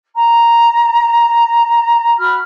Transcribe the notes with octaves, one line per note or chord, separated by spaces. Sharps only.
A#5
F#4 B5 F6